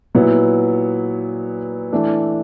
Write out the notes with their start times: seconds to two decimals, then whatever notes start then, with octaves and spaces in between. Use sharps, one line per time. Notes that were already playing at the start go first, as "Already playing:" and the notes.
0.15 A#2 F#3 B3 E4
1.92 E3 A3 D4